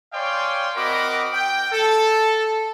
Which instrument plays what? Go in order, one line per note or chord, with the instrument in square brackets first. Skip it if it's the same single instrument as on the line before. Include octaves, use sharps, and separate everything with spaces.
[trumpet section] C#5 D5 F5 G5 G#5 C6
C4 F#4 A#4 D#5 B5 D6
G5
A4